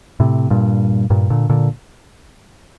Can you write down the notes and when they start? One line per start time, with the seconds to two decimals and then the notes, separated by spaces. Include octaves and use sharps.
0.20 A2 C3
0.50 G2 A#2
1.10 G2 A#2
1.30 A#2 D3
1.49 A#2 D3